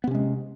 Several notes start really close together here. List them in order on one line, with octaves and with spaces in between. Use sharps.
B3 C3 C#4 G#3